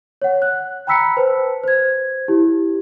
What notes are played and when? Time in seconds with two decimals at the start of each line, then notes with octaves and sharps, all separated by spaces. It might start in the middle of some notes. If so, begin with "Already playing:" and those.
0.22 C#5 F#5
0.42 F#6
0.87 G5 A#5 B5 E6 B6 C#7
1.17 B4 C5 A5
1.64 C5 G#6
2.28 E4 G4